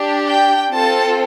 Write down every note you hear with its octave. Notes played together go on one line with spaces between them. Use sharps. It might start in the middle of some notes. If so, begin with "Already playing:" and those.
Already playing: D4 G4
G5
C4 F4 A4 A5